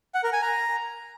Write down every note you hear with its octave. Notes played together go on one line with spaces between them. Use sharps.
F#5
A#4
G#5
A#5